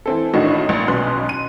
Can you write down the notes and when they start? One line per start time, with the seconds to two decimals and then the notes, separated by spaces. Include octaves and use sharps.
0.06 E3 C4 A4
0.34 A1 A2 D#3 D4 F#4 D#5
0.69 A#1
0.88 B1 B2 B3 C#4 C6 F#6
1.29 D#7